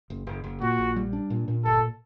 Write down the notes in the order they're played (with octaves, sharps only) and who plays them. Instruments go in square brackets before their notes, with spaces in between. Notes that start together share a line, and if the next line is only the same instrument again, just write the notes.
[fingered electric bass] F#1
F#1
F#1
[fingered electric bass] A#2 [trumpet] F#4
[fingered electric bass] A#1
G3
D4
A#2
A#2
[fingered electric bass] G1 [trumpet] A4